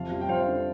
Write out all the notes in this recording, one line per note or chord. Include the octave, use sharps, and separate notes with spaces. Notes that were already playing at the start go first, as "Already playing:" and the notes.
Already playing: F2 C3 F5 A5
G3
G5
F2 C5 F5
D3